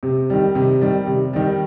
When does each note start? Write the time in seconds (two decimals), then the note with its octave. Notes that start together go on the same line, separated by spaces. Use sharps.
0.03 C3
0.30 D#3 G3
0.55 C3
0.81 D#3 G3
1.07 C3
1.33 D#3 G3